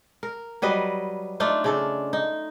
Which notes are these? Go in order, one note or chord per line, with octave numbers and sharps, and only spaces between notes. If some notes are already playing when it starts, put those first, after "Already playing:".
A#4
F#3 G3 B4 D#5
A3 D4 D#4 F4
C#3 D4 A4
D#4